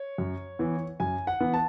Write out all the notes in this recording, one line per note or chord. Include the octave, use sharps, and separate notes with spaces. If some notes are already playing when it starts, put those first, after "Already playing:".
Already playing: C#5
F#2
E3 B3
F#2 G#5
F#5
E3 B3
A5